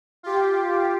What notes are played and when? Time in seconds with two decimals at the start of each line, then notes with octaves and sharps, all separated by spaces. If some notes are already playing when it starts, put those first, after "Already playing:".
0.23 F4 G4